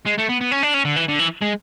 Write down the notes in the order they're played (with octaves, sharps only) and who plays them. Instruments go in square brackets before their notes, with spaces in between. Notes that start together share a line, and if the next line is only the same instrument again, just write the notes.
[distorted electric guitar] G#3
A3
B3
B3
C#4
D4
C#4
D3
E3
D3
E3
G#3